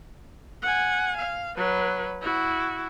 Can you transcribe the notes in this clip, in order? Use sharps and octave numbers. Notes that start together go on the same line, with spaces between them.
F#5 G#5
F5
F#3 B4
E4 F#4